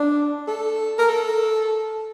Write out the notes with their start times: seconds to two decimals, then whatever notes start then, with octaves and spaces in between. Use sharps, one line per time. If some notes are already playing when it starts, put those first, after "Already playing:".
Already playing: D4
0.48 A4
0.98 A#4
1.09 A4